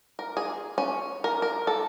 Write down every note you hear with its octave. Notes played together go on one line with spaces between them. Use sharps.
A#4
G#4
C#4
A#4
A#4
A4